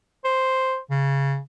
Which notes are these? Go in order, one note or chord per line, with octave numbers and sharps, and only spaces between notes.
C5
C#3